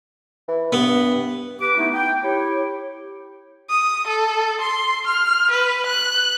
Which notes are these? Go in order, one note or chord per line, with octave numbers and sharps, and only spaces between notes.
E3
G2 B3
G4 B4 D6
A3 B3 D#4 E4
G5
E4 G4 C#5
D#6
A4
C6
F6
B4
F#6